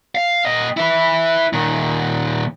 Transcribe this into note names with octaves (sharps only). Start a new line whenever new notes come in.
F5
A#2 D#5
E4 B4
A#2 D#3